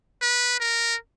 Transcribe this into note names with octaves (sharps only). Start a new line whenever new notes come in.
B4
A#4